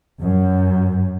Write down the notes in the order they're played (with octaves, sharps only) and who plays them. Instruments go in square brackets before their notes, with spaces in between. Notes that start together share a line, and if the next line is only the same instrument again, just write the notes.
[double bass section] F#2